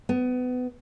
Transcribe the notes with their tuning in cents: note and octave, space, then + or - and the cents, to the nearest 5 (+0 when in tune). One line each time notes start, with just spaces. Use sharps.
B3 +25